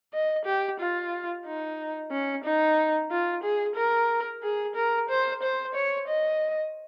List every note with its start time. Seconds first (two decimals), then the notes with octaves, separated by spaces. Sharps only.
0.13 D#5
0.45 G4
0.80 F4
1.46 D#4
2.11 C#4
2.44 D#4
3.11 F4
3.43 G#4
3.76 A#4
4.43 G#4
4.75 A#4
5.09 C5
5.42 C5
5.74 C#5
6.08 D#5